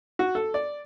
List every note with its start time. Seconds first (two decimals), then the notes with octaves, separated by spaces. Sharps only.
0.19 F#4
0.35 A4
0.54 D5